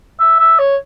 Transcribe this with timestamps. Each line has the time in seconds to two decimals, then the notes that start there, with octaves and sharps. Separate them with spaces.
0.20 E5
0.40 E5
0.59 C#5